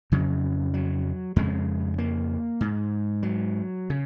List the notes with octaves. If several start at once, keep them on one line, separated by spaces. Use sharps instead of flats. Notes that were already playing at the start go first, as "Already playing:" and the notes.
F2 C#3 F#3
F#3
F2 C#3 G#3
A#3
G#2
F#3
C#3